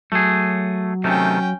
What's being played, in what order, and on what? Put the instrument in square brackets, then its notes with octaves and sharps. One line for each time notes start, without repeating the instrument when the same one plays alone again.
[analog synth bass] F#3 [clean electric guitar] A3 G#4
[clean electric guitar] C3 D#3 A3 [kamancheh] C#4 G5